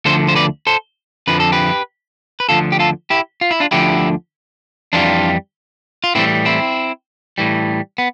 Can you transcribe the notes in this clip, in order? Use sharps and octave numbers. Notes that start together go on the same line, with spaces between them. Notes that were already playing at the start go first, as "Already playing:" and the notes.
D2 D3 F3 A4 C5
C5
B4 D5
A4 C5
F2 D3 F3 B4
A4
G4 B4
B4
D2 D3 F3 F4 A4
G4
F4 A4
E4 G4
F4
E4
D4 F4
D2 D3 F3 E4 G4
F2 E3 G3 D4 F4
F4
A2 E3 G3 C4 E4
C4 E4
A2 E3 G3
B3